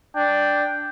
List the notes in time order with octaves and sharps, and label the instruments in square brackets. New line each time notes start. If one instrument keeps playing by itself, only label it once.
[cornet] D4 [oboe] G5